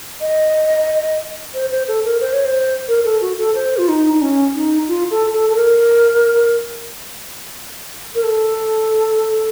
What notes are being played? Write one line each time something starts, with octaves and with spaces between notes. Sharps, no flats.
D#5
C5
C5
A4
A#4
C5
C#5
C5
A#4
A4
F#4
A4
C5
F4
D#4
D#4
C#4
D#4
F4
A4
A4
A4
A#4
A#4
A4